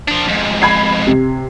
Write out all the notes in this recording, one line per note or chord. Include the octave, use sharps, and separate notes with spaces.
F3 D4
F2 G#2
B5 G#6 C7
C3